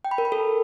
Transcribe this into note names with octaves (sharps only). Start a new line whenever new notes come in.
G5
B5
A#4
B5
A4